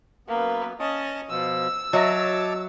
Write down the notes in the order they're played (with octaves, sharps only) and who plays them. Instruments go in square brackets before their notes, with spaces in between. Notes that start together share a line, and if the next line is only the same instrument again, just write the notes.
[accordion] F#2 B3 [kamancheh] A#3 B4
[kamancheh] C#4 [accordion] D#5 A5 D#6
[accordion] B2 F3 [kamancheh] E6
[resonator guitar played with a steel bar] F#3 [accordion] C#5 A5 D6 [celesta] D#5 E5 A#6